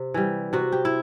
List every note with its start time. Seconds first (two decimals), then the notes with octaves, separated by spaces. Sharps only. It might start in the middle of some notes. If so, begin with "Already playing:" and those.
Already playing: C3
0.14 E3 G3
0.53 C3 F#4
0.72 G4
0.85 E4